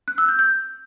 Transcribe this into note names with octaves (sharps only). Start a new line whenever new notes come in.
F#6
E6
G6
G6